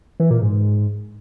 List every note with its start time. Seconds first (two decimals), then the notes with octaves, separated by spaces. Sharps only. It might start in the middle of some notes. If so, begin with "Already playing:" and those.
0.20 E3
0.31 A#2
0.41 G#2